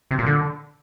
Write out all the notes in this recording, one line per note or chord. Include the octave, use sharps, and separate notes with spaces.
C3
A#2
D3